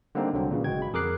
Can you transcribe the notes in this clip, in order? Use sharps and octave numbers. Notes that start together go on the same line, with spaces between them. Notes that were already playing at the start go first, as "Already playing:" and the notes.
D3 G3 A#3 C4 D#4
C2 D3 F#3 C4
A#2 C#3 E3
G1 G#3 F#4 G5 G#6
B5
F2 G#4 A#4 D6 F#6 C7